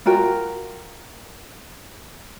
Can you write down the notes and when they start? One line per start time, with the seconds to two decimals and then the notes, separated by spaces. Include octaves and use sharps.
0.06 F4 F#4 A#4 G5